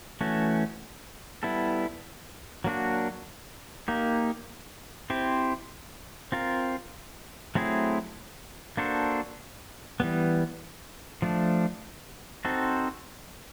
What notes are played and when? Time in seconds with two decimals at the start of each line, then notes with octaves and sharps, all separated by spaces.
0.21 E3 A3 C#4 F#4
1.43 G3 B3 E4 A4
2.64 F#3 A#3 D4 F#4
3.88 A#3 D#4 G4
5.10 C4 E4 G4 C5
6.32 C4 F4 A#4
7.55 F#3 A3 C4 E4 G#4
8.77 A#3 D4 F#4 A4 C5
10.00 E3 G3 B3
11.22 F3 A3 D4
12.45 C4 D#4 F#4 A4 C5